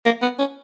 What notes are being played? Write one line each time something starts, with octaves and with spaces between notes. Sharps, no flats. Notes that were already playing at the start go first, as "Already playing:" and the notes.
A#3
B3
C#4